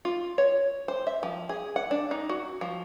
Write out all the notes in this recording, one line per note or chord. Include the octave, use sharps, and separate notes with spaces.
F4
C#5
C5
E5
F3
G#4
F#5
D4
D#4
F#4
F3